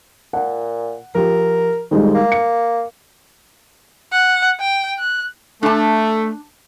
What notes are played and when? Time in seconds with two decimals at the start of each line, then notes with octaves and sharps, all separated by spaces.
0.33 A#2 F#5
1.15 F3 G4 A#4
1.91 F2 D#3 G3 G#3
2.14 A#3
2.32 C#7
4.12 F#5
4.60 G5
4.99 F#6
5.63 A3 D4 A5